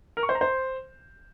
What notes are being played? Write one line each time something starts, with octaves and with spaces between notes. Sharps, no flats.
A#4
C#6
C5
A#5
C5